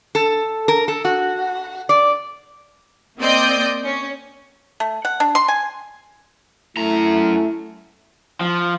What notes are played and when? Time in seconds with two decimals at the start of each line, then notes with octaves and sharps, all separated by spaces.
0.15 A4
0.68 A#4
0.88 A4
1.05 F#4
1.89 D5
3.20 A#3 C4 D5 D#5 G6
3.84 C#4
4.80 A3
5.05 F#5
5.20 D4
5.35 C6
5.48 G#5
6.77 F#2 A3 E4 A#5
8.41 F3